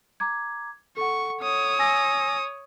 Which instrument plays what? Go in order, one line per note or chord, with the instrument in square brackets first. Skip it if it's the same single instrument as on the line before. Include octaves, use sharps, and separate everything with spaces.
[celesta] A#5 D6 G#6
[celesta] A4 F#5 [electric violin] C#6
[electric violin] C#5 D#6
[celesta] G#5 E6 A#6